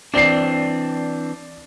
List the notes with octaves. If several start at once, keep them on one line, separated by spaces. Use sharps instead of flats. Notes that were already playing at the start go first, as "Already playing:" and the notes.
E3 C4 D4 D5 C7